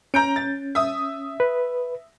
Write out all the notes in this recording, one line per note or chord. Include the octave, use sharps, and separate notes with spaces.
C#4 A#5 G6 D7
A6
E5 D#6
B4